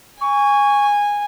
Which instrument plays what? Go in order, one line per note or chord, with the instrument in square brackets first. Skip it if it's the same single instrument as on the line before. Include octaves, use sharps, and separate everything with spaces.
[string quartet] G#5 [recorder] C#6